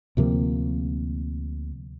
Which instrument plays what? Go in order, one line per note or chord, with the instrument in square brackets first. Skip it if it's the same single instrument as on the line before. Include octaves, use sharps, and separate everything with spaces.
[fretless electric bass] D2 C3 F3 A#3